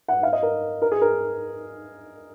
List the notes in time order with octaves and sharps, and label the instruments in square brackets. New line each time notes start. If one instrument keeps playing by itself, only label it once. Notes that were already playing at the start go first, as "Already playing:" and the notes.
[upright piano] F#5
F5
D#5
A#4
A#4
G#4
A#4